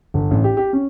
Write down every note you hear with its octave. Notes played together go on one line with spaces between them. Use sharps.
G1
A1
G4
G4
C#4